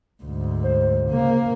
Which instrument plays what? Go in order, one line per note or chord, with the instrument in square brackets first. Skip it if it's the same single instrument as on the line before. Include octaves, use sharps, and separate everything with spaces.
[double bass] D2 G#2
[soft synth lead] C5
[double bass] C#3 A#3